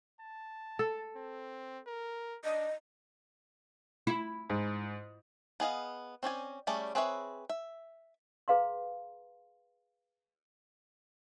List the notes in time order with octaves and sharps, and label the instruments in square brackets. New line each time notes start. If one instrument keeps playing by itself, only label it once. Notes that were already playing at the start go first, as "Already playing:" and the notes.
[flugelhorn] A5
[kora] A4
[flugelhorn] C4
A#4
[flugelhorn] D4 [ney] D#5
[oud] E4
[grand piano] G#2
[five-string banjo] B3 G#4 D#5 F5
C4 C#4 D5 G#5
G3 A3 C#4 G#4 D5
C4 G#4 B4 C#5 E5
E5
[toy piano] G#4 B4 F5 A#5 C6